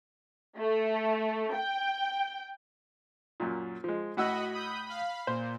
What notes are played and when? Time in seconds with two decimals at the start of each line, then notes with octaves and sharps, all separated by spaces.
0.58 A3
1.54 G5
3.40 F#2 A#2
3.84 F3 G#3
4.17 A2 F#4 D#5 F#5 B5 E6
4.53 B5 D#6 G6
4.86 F5 B5
5.27 A#2 C5